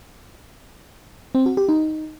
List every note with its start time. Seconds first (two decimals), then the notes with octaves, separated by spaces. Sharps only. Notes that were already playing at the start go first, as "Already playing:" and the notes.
1.35 C4
1.46 F#4
1.57 G4
1.69 D#4